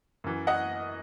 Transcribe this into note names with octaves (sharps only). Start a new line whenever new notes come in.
F#2 E3
D#5 F#5